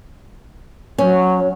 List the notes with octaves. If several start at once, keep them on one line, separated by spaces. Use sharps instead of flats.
F#3 C#4